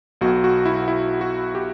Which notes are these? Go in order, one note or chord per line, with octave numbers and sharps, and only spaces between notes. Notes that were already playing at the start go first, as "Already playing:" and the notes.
B1 B2 F#4
F#4
E4
E4
F#4
G4